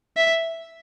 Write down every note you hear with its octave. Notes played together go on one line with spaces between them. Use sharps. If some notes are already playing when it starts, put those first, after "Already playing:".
E5